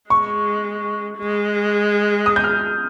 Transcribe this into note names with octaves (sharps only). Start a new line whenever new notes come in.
G#3 C#6
G#3
D#6
G6
F6